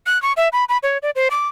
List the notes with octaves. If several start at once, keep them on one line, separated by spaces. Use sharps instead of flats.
F#6
C#6
E5
B5
B5
C#5
D5
C5
D6